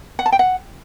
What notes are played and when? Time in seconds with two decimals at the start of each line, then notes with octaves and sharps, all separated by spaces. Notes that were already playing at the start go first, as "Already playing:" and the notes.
0.19 F#5
0.26 A5
0.32 G5
0.39 F#5